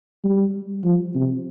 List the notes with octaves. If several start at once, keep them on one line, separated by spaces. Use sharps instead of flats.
G3
F3
C3